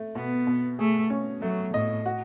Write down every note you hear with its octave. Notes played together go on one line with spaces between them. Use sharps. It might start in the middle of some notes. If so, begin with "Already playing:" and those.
Already playing: A3
B2 B3
B2
A3 G#4
C#4
F#3 A3
A2 D#5
F#4